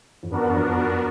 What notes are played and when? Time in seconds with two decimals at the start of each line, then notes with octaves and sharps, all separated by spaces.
0.23 F2
0.31 F#2 B3 D4 F#4 A#4
0.46 F#2
0.55 F2
0.79 F#2